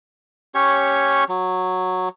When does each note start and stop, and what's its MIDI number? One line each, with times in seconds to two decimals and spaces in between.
0.55 1.24 61
0.55 1.24 67
0.55 1.24 73
0.55 1.24 85
1.29 2.09 54